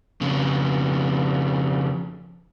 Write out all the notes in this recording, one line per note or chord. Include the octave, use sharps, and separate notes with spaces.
F2 C#3